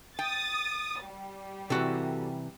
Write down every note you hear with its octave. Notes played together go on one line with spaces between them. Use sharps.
G5 D#6 A6
G3
C3 E3 F#4 A4